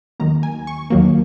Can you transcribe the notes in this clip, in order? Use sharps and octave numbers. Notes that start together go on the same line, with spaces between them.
D#2 D#3 F#3 A#3 A#5
G#5
C#6
D#2 D#3 F#3 A#3